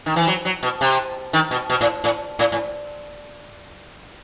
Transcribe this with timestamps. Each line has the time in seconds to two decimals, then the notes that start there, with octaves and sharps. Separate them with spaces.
0.06 D#3
0.16 E3
0.27 F#3
0.45 F#3
0.63 B2
0.81 C3
1.33 D#3
1.51 B2
1.70 B2
1.81 A2
2.04 A2
2.39 A2
2.52 A2